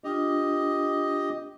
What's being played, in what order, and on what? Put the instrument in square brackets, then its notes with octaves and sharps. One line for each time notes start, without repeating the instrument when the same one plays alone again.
[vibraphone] D4 F4 [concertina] G4 D#5